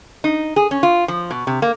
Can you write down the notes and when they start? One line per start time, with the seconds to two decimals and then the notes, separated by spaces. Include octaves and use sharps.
0.24 D#4
0.56 G#4
0.71 C#4
0.83 F4
1.08 F3
1.31 B2
1.47 C3
1.62 A#3